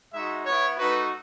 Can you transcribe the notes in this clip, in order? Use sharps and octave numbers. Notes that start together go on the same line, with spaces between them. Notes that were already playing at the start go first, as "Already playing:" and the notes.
G#3 D#4 F#4 E5
B3 E4 C#5
A3 D#4 F#4 B4